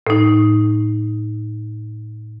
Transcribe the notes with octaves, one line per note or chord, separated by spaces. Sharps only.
A2 D#4